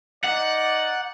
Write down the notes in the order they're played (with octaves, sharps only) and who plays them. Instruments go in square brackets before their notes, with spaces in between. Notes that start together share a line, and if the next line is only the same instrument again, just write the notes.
[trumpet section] D#4 D5 [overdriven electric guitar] F#5